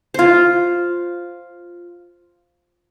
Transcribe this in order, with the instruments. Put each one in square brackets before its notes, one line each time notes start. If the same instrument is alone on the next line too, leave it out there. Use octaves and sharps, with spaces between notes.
[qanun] F4 C5